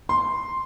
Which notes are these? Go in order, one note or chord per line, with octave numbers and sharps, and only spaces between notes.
C6